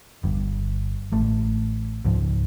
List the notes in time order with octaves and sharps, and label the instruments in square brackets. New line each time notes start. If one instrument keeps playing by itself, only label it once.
[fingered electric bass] G1 G2
A1 A3
C#2 G#2 F3